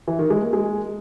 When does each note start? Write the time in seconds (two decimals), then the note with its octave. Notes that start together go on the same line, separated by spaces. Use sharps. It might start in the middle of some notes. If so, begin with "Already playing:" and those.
0.08 E3
0.19 D#3
0.30 G#3
0.42 A#3
0.53 G#3